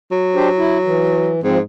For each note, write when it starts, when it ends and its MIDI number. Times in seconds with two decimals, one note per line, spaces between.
0.12 1.33 54
0.35 0.49 62
0.35 0.49 67
0.35 0.49 72
0.58 0.78 64
0.85 1.40 52
1.44 1.61 44
1.44 1.58 53
1.44 1.58 60